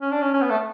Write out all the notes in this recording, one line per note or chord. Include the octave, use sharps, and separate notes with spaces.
C#4
D4
C#4
C#4
B3
A3